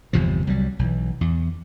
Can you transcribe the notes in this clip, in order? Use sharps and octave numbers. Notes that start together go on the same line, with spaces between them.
G1 E2 C3 F3
C2 F#3 G3
B1 E3
E2